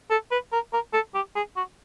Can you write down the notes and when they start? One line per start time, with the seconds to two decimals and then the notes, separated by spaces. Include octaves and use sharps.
0.10 A4
0.31 B4
0.52 A#4
0.73 A#4
0.93 A4
1.15 G4
1.35 G#4
1.56 F#4